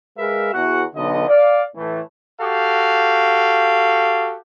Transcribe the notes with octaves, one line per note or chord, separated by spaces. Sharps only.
G#3 G#4 A#4 B4 E5 F5
E2 F#4 F#5
B1 D3 D#5
D5 F5
A2 E3 A3
F#4 G4 A4 F5